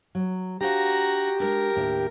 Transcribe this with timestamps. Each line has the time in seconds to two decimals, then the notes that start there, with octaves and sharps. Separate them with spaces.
0.15 F#3
0.61 D4 F#4 G4 C5 F5 A#5
1.40 G#3 D4 A#4
1.76 D#2 A2 D4